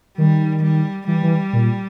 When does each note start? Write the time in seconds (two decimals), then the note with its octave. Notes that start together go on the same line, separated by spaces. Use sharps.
0.18 D#3 G3
0.63 G3
1.07 E3 G3
1.23 E3
1.53 A#2